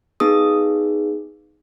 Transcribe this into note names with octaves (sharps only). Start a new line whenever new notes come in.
B3 D#4 G#4 D#6